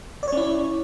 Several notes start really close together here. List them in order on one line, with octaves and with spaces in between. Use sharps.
D5 C#5 C#4 E4